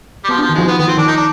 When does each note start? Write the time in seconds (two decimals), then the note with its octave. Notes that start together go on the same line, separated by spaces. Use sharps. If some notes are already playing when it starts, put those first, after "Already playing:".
0.24 G3
0.29 F3 B3
0.39 D4
0.42 F3
0.49 D#3
0.54 F3 G#3
0.68 F3 B3
0.78 D#3 B3
0.87 F3 C4
0.97 D#3 D4
1.08 D#4
1.17 D4